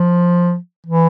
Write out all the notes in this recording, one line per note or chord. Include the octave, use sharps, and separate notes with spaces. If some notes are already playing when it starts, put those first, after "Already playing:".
Already playing: F3
E3